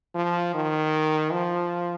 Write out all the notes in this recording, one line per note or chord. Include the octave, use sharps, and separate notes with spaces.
F3
D#3
F3